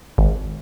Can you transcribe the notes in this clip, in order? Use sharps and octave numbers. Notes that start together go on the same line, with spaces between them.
G#1